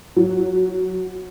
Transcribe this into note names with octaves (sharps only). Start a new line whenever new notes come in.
F#3